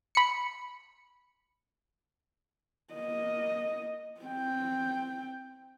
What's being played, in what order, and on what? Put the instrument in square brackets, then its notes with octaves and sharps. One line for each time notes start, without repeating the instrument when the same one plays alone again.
[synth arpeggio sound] B5 C#7
[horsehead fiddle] A#3 D#5
C4 G5